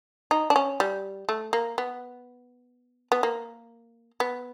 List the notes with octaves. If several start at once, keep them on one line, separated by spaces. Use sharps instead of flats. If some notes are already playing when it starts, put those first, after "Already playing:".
D#4
D4
C#4
G3
A3
A#3
B3
B3
A#3
B3